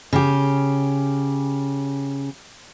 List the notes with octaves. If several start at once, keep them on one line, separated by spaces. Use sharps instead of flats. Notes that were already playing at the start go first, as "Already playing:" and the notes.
C#3 G4